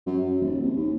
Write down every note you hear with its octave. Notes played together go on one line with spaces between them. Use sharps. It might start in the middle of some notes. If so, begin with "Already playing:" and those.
F#2
F#2
D#1
C2
D#2